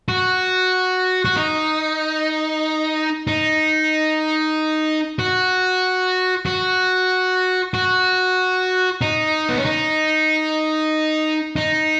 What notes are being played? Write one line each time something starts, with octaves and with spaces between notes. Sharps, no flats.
F#4
F#4
D#4
D#4
F#4
F#4
F#4
D#4
B3
C#4
D#4
D#4